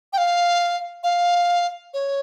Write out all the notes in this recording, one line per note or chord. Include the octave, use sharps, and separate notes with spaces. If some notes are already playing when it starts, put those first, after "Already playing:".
G5
F5
F5
C#5